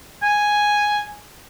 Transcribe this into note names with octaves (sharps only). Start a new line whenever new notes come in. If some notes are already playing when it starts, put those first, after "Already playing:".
G#5